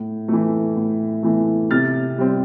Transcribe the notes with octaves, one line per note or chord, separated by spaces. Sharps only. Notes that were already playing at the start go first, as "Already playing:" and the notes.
Already playing: A2
E3 A3
A2
E3 A3
C3 F6 A6
G3 C4